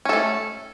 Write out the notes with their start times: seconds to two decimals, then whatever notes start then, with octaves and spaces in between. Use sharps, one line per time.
0.05 C#4
0.09 A4
0.13 A3